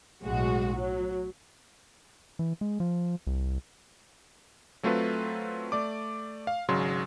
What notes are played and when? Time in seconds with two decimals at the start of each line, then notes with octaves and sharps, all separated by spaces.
0.24 B1 A2 G#3 F#4
0.75 F#3
2.39 E3
2.61 G#3
2.80 F3
3.27 C2
4.83 F#3 A3 C4 F4 A4 B4
5.72 A3 D5 D6
6.47 F5
6.69 G#1 C#3 F#3 G#3 C6